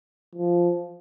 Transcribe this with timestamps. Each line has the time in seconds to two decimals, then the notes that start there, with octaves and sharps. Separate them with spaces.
0.35 F3